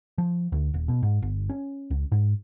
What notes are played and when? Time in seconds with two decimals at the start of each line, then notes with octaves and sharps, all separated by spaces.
0.18 F3
0.52 D2
0.74 D#1
0.88 B2
1.03 G#2
1.22 G1
1.50 C#4
1.91 C#2
2.12 G#2